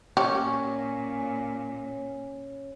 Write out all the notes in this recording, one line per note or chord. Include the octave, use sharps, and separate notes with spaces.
A#2 C#4 G4 C#5